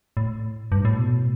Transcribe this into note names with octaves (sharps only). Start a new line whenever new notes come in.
A2
G2
A2
B2